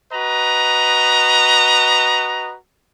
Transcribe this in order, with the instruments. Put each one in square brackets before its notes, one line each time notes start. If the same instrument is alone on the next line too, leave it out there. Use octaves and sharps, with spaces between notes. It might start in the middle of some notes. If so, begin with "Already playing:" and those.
[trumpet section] F#4 B4 D#5 A#5